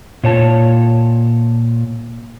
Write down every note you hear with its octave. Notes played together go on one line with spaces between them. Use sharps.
A#2 C#5 A5